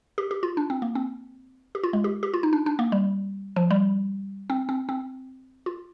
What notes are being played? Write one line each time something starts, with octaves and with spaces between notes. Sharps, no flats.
G4
G4
F4
D4
C4
A#3
C4
G4
F4
G#3
G4
G4
F4
D#4
D4
D4
A#3
G3
F3
G3
C4
C4
C4
F4